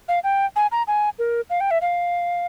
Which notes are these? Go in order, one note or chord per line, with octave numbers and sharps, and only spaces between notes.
F5
G5
G#5
A#5
G#5
A#4
F5
G5
E5
F5